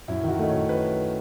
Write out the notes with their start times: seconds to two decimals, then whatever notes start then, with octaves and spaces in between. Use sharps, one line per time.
0.08 F#2 E4
0.23 D#3 F#4
0.39 A3 D#5
0.49 F#2 C#5
0.69 B4